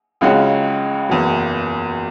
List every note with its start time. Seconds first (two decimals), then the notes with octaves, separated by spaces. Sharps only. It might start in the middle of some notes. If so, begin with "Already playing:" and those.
0.21 C#2 C#3 G#3 C#4 F#4
1.09 F#1 E2 B2